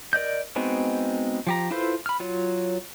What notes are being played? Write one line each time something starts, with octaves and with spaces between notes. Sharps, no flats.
A#4 D5 D#5 G6
G#3 B3 C4 D#4 F#4
F3 G4 A#5
E4 F4 A4 B4 C5
B5 F6
F#3 F4 C#5